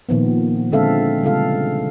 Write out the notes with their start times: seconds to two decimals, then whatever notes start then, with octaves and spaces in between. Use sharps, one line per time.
0.09 A#2 D#3 F3 B3
0.72 D3 G#3 C4 A4 E5 F5
1.23 C#3 G3 G#3 F4 A4 F5